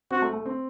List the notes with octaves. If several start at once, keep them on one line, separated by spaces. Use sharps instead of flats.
C4 F#4
A3
A3
C4